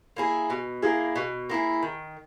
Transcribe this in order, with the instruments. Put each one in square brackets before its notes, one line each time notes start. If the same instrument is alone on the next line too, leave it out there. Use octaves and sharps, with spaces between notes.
[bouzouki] A#3 E4 G#4
B2
A#3 E4 G#4
B2
A#3 E4 G#4
D#3